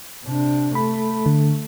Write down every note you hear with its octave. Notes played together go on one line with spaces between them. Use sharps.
C3 D4
A3 B5
D3